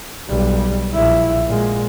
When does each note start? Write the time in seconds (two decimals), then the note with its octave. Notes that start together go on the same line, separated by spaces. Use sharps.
0.28 B1 G3
0.94 A#1 E4
1.47 A#2 G#3